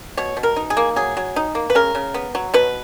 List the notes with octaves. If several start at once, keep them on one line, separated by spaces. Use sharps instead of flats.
B2 C#5
B2
A#4
D#4
G#4
A#3
F#3 G#4
F#3
D#4
A#3
B4
C#3 A#4
C#3
B3
F#3
B2 B4